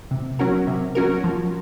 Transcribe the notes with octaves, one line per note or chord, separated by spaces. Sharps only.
C3
F#3 C#4 F#4 A#4
C3
F#3 C#4 F#4 A#4
F3